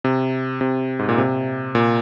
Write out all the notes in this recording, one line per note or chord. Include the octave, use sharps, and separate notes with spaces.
C3
C3
G#2
A#2
C3
A#2